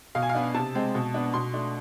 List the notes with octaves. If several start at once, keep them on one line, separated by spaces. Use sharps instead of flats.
B2 F5
G#5
F5
B3 D4
C3 A5
G#3 C4
B2
B3 D4
B2 C6
A3 D4